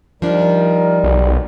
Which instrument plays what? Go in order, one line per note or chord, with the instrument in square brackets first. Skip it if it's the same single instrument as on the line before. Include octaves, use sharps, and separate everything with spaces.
[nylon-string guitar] F3 D4 [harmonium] G3 [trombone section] D#4 A#4
[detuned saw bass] B1